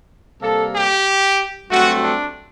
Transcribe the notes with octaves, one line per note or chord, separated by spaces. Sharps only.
C3 G3 A#3 A4
G4
G2 F#3 A3 C4 F#4
D4